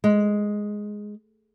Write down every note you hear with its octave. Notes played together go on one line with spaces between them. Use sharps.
G#3